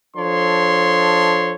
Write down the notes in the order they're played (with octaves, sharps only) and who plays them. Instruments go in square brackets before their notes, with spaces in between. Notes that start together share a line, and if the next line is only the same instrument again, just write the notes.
[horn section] F3 D4 A4 C#5 C6